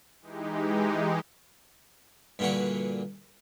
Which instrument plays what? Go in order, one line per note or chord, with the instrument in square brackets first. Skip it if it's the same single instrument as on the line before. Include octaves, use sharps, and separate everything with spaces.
[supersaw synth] E3 G#3 D#4 G4
[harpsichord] G2 A#2 D3 E3 F#4